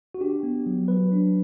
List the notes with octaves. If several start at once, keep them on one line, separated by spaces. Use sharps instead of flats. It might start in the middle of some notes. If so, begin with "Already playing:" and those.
F#4
D4 G4
B3
F#3
F#3 B4
D4